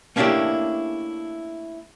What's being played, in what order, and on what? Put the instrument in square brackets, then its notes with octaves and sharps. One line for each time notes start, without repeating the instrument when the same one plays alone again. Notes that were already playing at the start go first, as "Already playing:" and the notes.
[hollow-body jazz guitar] A3 A#3 C#4 D4 E4 G4